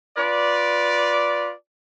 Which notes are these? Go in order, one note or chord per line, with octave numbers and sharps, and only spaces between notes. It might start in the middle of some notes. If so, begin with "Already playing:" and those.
F4 B4 D5